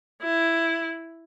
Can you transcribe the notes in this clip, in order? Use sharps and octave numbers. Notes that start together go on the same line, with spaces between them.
E4